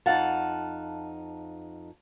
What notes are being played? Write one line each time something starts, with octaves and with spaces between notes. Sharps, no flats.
F2 D#4 F5 F#5 A5